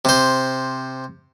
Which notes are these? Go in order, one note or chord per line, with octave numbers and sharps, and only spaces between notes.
C3 C5